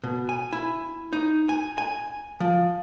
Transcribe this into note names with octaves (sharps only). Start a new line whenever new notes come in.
B2
G#5
E4
D#4
G#5
G#5
F3